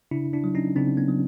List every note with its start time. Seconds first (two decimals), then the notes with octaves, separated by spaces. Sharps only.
0.11 C#3 D4 E4
0.33 D4 E4
0.44 F#3
0.55 C#4 D#4
0.76 C#3 C4 D4
0.97 B3 C#4
1.08 F#3